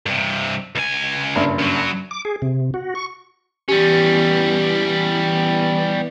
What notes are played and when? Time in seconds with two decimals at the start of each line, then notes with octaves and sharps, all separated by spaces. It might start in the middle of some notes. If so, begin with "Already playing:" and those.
0.06 G2 C3
0.76 C#2 G#5
1.35 F#1 G2
1.59 F#2 F#3
2.11 D6
2.25 G#4
2.42 C3
2.74 F#4
2.95 C#6
3.68 E3 G3 B3 C#4 G4